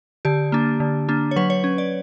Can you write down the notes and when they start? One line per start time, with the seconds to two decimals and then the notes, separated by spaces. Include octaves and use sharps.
0.25 D3 G4
0.52 A#3 D4
0.80 D3
1.08 A#3 D4
1.31 C#5
1.36 F#3 B4
1.50 C#5
1.64 C#4
1.78 D5